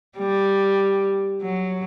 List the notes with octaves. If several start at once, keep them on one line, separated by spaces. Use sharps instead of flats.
G3
F#3